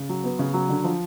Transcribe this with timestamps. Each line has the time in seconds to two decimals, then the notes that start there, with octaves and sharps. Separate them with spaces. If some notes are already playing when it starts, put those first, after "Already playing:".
Already playing: C#3
0.09 F#3
0.24 B3
0.39 C#3
0.53 F#3
0.69 D3
0.84 F3